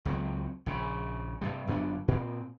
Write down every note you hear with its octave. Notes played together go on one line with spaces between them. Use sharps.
C#2 F#3 G3 C4
A#1 C#3
G2 C3 G3
G1 F#2 B3 D4
A#2 C4